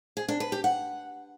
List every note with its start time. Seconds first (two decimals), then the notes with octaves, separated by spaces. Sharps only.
0.17 G#4
0.29 D4
0.40 B4
0.52 G4
0.64 F#5